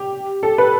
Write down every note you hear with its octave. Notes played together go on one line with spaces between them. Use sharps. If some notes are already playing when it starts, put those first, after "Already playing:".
Already playing: G4
A4
B4